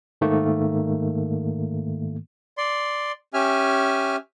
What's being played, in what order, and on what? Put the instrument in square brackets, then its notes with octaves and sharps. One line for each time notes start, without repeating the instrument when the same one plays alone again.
[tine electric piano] G#2 D#3 A3 A#3
[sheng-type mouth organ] D5 C6
C#4 G4 E5 G#5 F6